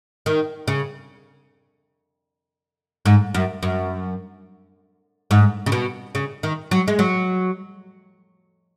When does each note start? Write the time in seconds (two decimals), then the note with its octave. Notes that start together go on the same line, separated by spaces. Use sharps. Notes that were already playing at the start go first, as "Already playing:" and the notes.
0.26 D#3
0.68 C#3
3.05 G#2
3.34 F#2
3.63 F#2
5.31 G#2
5.66 C#3
5.72 B2
6.15 C#3
6.43 D#3
6.71 F#3
6.88 G#3
6.99 F#3